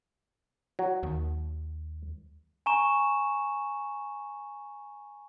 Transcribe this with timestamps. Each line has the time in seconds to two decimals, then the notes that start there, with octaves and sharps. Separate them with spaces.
0.79 F#3
1.03 D#2
2.66 G#5 A#5 C#6 E7